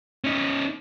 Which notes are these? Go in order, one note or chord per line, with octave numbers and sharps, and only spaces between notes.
C#4 D#4